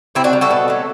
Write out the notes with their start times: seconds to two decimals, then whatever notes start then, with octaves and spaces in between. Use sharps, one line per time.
0.15 C3 C4 E4
0.24 D4 F#4
0.33 G3
0.41 F#4 A4
0.51 B2
0.68 F#3 A3